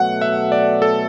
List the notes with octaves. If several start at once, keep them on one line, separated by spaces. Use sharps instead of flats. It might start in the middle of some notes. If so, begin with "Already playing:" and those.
Already playing: B2 F#3 A3 F#5
E5
D5
A4